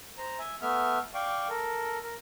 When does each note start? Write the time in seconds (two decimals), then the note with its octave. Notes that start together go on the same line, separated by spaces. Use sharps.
0.18 C5 A#5
0.39 E5 G#5
0.61 A3 B3 E5 F6
1.14 D5 F5 G5 C#6 D6
1.49 A4 A#4
2.03 A#4